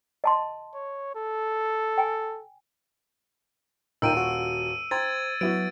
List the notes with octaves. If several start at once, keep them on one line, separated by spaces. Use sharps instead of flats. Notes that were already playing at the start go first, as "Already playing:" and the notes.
D#5 A5 C6
C#5
A4
G5 G#5
D#1 D#4 F4 A#4 G5 E6 D7 D#7
F#4
C5 G5 A#5 G#6 A6
F#3 B3 E4 F#4 D7